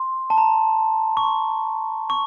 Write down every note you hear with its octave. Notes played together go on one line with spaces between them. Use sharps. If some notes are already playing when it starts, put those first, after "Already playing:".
Already playing: C6
A5
A#5
C#6
C6
C#6